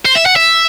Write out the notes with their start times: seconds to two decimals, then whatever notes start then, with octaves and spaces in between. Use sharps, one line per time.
0.05 C5
0.15 E5
0.26 F#5
0.36 E5